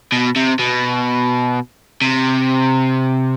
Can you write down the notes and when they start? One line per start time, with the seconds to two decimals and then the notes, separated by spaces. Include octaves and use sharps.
0.12 B2
0.36 C3
0.59 B2
2.02 C3